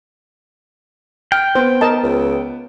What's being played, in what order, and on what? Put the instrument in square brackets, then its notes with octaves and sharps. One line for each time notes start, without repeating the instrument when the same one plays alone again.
[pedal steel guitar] G5 [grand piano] F6
[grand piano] B3 [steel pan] C5
[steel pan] A#4 D#5 A5
[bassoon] C#2